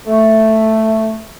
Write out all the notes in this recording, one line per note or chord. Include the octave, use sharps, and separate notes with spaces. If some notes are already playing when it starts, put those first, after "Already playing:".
A3